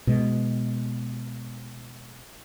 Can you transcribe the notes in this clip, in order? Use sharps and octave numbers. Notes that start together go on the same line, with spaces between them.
B2 G#3